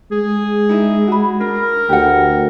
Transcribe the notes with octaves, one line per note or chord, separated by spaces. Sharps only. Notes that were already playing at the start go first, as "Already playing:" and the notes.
G#3 G#4
D#4 E4 D#5
F#4 B5
D4 A#4
D2 G4 F#5